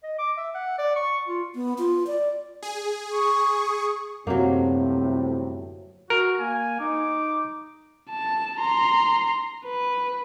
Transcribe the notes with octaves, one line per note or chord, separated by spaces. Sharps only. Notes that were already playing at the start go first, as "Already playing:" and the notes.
D#5
D6
E5
F#5
D5
C#6
F4
B3
F4
D5
G#4
C#6 D#6
G1 F#2 A2 C3 F#3 A#3
F#4 A#4
A#3 G#5
D#4 D6
A5
A#5 C6
B4